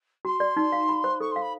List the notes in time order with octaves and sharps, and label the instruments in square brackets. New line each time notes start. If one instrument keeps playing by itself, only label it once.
[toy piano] F#4 [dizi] C6
[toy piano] D5
D#4
F5
B5
C5
[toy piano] A4 [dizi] C#6
[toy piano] F5 [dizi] C6
[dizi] B5